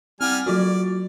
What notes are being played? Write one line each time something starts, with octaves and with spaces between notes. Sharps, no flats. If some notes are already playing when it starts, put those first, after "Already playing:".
G3 C4 F#5 G#5 F6
F#3 F4 F#4 D5